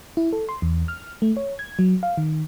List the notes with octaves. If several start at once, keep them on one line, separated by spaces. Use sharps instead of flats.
E4
A4
C6
E2
F6
A3
C#5
G#6
F#3
F5
D#3